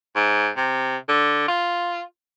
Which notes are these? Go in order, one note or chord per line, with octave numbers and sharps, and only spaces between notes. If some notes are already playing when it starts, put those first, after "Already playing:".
G#2
C3
D3
F4